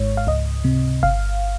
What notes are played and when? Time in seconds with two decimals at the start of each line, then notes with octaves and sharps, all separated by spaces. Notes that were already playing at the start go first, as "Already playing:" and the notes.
Already playing: G#1 G#2 C#5
0.17 F5
0.27 C#2 D#5
0.64 C3
1.03 G1 F5